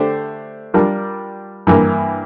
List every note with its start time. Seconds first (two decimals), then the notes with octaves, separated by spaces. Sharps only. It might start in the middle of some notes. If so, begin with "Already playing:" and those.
Already playing: D3 A3 D4 G4 C5
0.74 G3 D4 F4 A#4
1.67 G2 E3 A#3